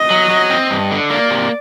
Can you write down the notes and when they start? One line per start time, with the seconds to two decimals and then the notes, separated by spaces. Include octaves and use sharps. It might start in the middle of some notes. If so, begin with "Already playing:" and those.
Already playing: D#5
0.11 F#3
0.30 F#3
0.50 C4
0.71 G2
0.91 D3
1.10 A#3 D5
1.30 C3